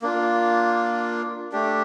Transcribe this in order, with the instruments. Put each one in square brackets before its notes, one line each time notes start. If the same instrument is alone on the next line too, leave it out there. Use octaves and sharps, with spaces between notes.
[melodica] A#3 D4 F4
A3 D4 G4